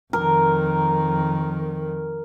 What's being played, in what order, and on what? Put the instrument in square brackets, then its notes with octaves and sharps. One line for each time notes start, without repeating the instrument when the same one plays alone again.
[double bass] F2 D#3 [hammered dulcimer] A#4